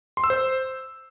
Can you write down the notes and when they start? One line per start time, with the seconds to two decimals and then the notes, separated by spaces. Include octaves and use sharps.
0.17 C6
0.24 E6
0.30 C5